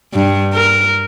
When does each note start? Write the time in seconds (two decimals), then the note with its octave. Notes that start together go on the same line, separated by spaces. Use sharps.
0.14 G2
0.54 A#4